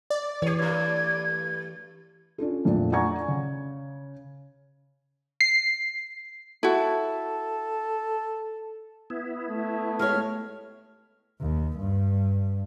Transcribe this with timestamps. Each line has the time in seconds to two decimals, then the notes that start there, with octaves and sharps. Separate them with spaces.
0.10 D5
0.42 E3 G4 C#5
0.59 G2 A3 G#6
2.38 C#4 D4 F4 A4
2.65 F2 A#2 F3 A3 D4
2.92 D5 F#5 G#5 A#5 C#6 G#6
3.28 C#3
5.41 C7
6.63 E4 F#4 A4
9.10 B3 E4
9.50 A3
9.99 G#3 G4 C#5 F6
11.40 D#2
11.78 G2